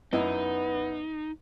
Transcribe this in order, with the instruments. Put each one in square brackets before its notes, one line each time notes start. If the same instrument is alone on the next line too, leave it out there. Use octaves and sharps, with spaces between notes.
[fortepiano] F#2 E4 D#5 [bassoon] B3 [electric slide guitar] D#4